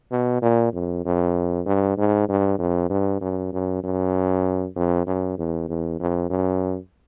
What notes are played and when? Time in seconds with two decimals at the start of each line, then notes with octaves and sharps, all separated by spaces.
0.11 B2
0.42 A#2
0.73 F2
1.05 F2
1.66 G2
1.98 G#2
2.29 G2
2.59 F2
2.90 G2
3.21 F#2
3.53 F#2
3.84 F#2
4.76 F2
5.07 F#2
5.38 E2
5.69 E2
6.00 F2
6.30 F#2